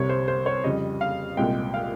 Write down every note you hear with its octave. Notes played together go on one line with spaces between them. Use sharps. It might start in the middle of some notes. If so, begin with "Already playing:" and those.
Already playing: C2 C3 G3 C#5
C5
C5
C#5
F2 C#3 G3 D#5
F5
C2 A#2 G#3 G5
F5